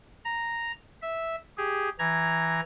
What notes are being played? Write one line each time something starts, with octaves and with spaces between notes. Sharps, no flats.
A#5
E5
G4 G#4
E3 A#5 G#6